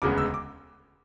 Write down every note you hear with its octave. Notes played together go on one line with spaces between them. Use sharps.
E1 D2 C#3 G#3 B3 D6
E6
D6